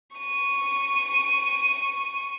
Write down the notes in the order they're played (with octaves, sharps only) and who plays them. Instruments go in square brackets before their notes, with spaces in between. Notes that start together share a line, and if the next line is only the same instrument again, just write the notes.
[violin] C#6 D#7